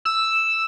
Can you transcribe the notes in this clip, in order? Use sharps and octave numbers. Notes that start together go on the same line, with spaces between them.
E6